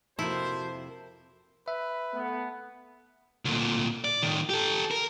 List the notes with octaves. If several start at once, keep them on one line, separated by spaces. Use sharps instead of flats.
F2 C3 A#3 E4 F#4 C5 A5
B4 E5
A3 B3
D2 A#2
D5
A2 D#3
G4 A4
A#4